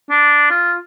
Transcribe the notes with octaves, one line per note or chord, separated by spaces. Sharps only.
D4
F4